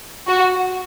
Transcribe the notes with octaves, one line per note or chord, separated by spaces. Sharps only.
F#4